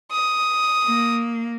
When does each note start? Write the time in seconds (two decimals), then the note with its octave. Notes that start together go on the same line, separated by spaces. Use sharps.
0.12 D#6
0.86 A#3